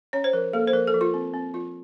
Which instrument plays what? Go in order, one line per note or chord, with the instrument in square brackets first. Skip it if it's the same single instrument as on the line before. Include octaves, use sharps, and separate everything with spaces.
[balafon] C#4 C#5
C5
F3 A#4
A#3 A4
C5
F3 A#4
A4
F3
F4
C4
C4
F3 F4